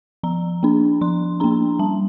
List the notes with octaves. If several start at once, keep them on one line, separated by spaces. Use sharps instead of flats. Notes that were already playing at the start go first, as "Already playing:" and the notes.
F3 A#5
A#3 D4
F3 C6
A#3 D4 A#5
G3 A5